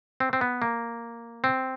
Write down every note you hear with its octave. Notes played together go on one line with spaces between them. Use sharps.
C4
C4
B3
A#3
C4